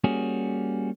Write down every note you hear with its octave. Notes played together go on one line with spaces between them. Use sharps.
G3 A#3 C#4 F#4 G#4